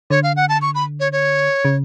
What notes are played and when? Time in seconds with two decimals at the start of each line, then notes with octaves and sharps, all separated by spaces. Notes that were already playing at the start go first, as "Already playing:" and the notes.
0.10 D3 C#5
0.23 F5
0.36 F#5
0.49 A5
0.62 C#6
0.75 B5
1.00 C#5
1.12 C#5
1.65 C#3